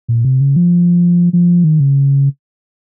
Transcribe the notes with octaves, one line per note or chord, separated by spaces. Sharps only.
A#2
C3
C#3
F3
F3
D#3
C#3